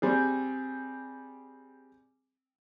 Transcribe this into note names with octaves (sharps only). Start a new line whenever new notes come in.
G3 C4 G#4